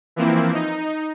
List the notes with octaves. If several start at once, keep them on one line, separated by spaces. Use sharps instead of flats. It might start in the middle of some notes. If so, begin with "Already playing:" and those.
E3 F3 A#3 C4 E4
D#4